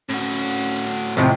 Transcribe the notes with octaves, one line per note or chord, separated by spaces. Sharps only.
A2 C#4 F#4
D#2 A2 C3 F3